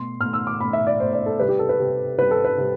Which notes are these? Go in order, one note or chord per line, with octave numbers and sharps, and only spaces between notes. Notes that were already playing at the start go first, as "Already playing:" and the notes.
Already playing: B2 A3 C6
B2 A3 F6
E6
D6
B2 A3 B5
E5
D5
B2 A3 C5
D5
A4
C3 G3 B4
G4
A4
B4
C3 G3
C3 G3 B4
A4
B4
C3 G3